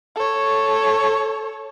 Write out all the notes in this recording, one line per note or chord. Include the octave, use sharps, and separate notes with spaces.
A4 C#5